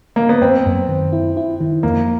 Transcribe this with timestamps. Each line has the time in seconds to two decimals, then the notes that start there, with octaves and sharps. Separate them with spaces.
0.16 A#3
0.29 B3
0.42 F#2 C4
0.66 F#2
0.89 D#3
1.13 E4
1.37 E4
1.61 D#3
1.83 F2 A#3